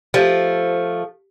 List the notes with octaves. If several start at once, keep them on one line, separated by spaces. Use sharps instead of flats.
F3 A3 G4